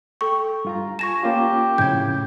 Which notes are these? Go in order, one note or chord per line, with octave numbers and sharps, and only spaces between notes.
A4 G5 C#6
G2 F4 A#5
F4 G#5 A5 C#6 A#6 E7
A#3 C#4 F4 G4
F2 A2 C#3 G6 G#6